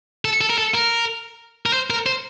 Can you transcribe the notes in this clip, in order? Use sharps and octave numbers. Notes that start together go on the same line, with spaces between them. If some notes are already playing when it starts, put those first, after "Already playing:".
A4
A4
A#4
A4
A#4
A#4
C5
A#4
C5